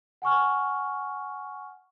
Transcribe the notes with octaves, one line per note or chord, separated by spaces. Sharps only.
F#5 G#5 C#6 F6